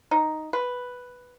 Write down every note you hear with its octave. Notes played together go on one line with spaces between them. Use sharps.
D#4
B4